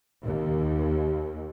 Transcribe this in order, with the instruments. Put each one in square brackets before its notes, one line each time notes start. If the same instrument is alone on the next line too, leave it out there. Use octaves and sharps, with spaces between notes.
[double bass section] D#2